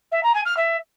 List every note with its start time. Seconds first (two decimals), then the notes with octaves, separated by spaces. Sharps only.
0.11 E5
0.23 A#5
0.34 G#5
0.45 F6
0.56 E5